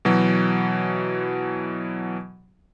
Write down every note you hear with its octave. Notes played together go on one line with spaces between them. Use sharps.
B2 E3 F#3